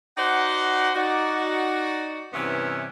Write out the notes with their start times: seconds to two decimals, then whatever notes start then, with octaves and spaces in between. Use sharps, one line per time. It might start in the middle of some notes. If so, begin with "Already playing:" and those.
0.17 D#4 F#4 C5 D5 F#5
0.95 D#4 F#4 D5
2.33 G2 C3 E3 B3 C#4 E4